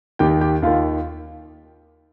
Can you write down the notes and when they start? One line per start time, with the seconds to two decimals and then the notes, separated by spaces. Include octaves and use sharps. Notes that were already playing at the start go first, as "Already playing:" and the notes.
0.19 D#2 D#3 G4 G5
0.41 G4 G5
0.62 D#2 D#3 F4 F5